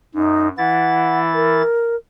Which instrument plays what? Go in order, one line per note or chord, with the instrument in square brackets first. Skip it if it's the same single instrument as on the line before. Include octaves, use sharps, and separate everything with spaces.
[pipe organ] F#2 [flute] D#4
[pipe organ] E3 E4 A6 [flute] F#5
[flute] A#4